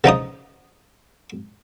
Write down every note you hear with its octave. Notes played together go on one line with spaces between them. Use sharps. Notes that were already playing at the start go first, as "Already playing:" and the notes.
C#3 F3 D#4 D#6